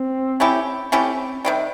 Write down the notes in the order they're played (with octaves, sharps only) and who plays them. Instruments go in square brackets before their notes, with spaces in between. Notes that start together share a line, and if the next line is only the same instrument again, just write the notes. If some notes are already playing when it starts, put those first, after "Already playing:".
Already playing: [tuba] C4
[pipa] A3 C#4 E4 G4
[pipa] A3 C#4 E4 G4 [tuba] C4
[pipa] C3 D#3 G3